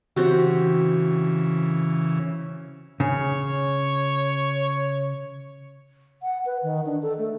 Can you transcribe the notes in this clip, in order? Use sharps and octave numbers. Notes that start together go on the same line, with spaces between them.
C#3 E3 C4 F#4 G4
C#3 C#5
F#5
B4
D#3
D4
A4
A3